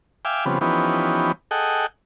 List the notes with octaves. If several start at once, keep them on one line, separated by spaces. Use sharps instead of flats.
E5 F5 G5 G#5 D6
C#3 F3 G3 B3 C4
E3 F3 B3 C#4 D#4 G4
G#4 A4 D#5 F#5 G5